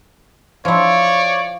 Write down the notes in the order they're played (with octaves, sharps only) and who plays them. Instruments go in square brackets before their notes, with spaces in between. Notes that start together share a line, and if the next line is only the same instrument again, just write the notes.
[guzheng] F3 E4 [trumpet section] C#5 D5